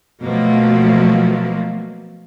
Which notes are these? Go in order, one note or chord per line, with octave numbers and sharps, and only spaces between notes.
B2 F3 F#3 A3 A#3